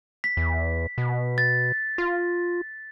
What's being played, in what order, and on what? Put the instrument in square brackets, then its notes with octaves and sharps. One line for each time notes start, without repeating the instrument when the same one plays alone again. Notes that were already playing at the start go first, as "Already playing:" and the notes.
[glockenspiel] B6
[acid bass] E2
B2
[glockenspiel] A6
[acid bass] F4